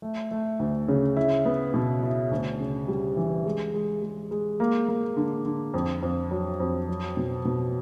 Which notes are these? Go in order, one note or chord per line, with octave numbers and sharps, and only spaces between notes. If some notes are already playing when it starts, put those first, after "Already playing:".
A3
A3
D2
C#3
E4
B3
B2
E4
D2
C#3
G3
E3
G#3
G#3
G#3
G#3
A#3
A#3
D3
D3
F2
F2
F#3
F2
F#3
B2
B2